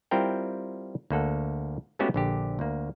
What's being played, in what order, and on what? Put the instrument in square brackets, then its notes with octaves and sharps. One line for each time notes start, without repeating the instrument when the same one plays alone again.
[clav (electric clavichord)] G3 C4 E4 F4 A#4 G5
D2 A#3 A4 F#5
G#3 A3 B3 C#4 F#4 G4
A#1 D3 G4
D2 A#3